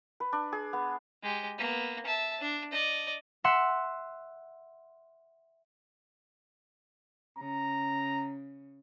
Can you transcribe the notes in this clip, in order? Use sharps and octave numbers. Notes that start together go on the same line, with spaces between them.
B4
D4
G#4
B3
G#3 G4
A#3 B3
E5 A5
D4
D5 D#5
E5 F#5 C6 E6 C#7
C#3 A#5